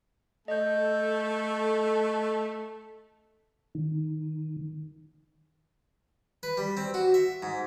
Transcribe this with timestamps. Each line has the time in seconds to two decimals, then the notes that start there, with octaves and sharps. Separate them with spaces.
0.48 A3 A4 D#5 G6
3.75 D#3
6.43 B4
6.57 G3
6.77 C4
6.94 F#4
7.14 E5
7.43 G#2